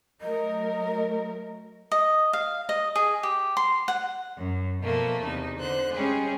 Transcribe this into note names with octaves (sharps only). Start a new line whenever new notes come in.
F#3 A3 A#4 D#5
D#5
F5
D#5
G#4
G4
C6
F#5
F#2
B2 F3 A3 A#3
E2 C3 D#4
D3 C5 F#6
G3 G#3 C#4 G#4